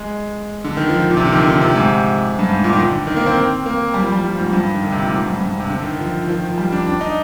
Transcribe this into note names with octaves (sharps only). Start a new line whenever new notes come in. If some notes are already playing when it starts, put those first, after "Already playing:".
Already playing: G#3
D3
D#3
F3
A#2
C3
D3
D#3
D3
C3
G#2
G2
G#2
A#2
D#3
D3
D#3
A#3
C4
A#3
G3
F3
G3
F3
G#2
G2
D#3
D3
C3
A#2
G#2
G2
G2
C3
D3
D#3
F3
D#3
F3
D#3
F3
G3
D4
D4
D#4